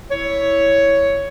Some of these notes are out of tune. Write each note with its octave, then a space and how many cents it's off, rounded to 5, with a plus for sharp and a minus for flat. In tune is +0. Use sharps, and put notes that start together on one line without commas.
E4 +0 C#5 +10